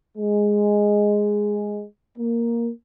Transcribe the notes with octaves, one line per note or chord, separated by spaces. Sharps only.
G#3
A#3